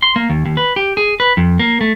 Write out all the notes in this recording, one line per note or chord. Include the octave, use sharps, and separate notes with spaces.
C6
A#3
D#2
D#2
B4
G4
G#4
B4
F2
A#3
A3